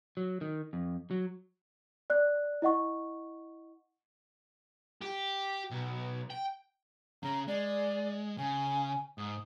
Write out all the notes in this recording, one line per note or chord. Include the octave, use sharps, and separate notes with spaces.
F#3
D#3
F2
F#3
D5 F#6
E4 D#5 F#5 C#6
G4
B1
G5
C#3 C#4 A#5
G#3 D5
C#3 G#5
G#2 D#6